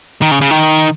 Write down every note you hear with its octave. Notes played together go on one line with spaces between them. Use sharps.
D#3
C#3
C#3
D#3